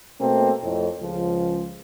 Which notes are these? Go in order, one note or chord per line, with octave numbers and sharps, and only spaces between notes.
B2 A3 A#3 C4
F2 A2
C#2 F3